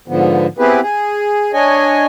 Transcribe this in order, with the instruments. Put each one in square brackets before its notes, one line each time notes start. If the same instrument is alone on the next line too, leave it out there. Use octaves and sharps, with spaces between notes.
[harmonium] G#2 D3 F3 B3
B3 C4 E4 G4 G#4 B4
G#4
D4 C#5 D#5 G#5